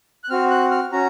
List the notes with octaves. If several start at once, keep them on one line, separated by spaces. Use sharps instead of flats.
F#6
C4 F#4 F6
F#6
F6
C#4 F#4 A#5